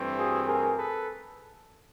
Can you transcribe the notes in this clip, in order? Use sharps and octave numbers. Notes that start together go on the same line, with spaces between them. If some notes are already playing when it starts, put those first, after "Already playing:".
Already playing: G2 E3 A3 C4
F#4 G#4
G#4 A#4
A4 B4